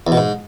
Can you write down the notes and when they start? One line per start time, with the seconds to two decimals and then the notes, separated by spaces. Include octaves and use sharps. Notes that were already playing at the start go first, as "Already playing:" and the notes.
0.07 E2
0.12 B2
0.17 G#2